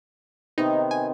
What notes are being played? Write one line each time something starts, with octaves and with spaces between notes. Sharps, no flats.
C3 D#3 B3 D#4
G#5